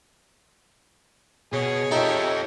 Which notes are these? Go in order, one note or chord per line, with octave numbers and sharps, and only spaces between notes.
B2 G#4 C#5
D#4 F4 G4 A4 E5